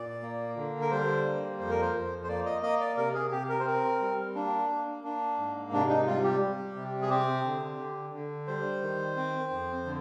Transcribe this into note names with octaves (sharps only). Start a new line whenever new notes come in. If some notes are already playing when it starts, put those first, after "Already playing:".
Already playing: A#2 D5
A#3
D3
A#4
G3 C5
A#3
F2 C5
A#4
C5
F2
C5
A#3 D5
D#5
A#3 D#5
D5
C3 A#4
G#4
C3 G4
A#4
C5
C4 A#4
G3
A#3 D4
A#3
A#3 D4
G#2
C3 D4
D#4
G3 F4
G4
G3
C3
G#4
C4 G4
D3
D3
D3
G3 C5
D#3
C4
F2
D3